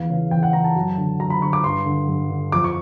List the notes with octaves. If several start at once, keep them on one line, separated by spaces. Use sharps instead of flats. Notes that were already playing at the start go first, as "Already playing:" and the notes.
Already playing: E2 F5
C#3 E3
E2 G5
F#5
C#3 E3 A#5
A5
F#2
D3
F#2 A#5
B5
D3 C#6
D6
G2 C6
D3
G2
D3
F2 D6
C#6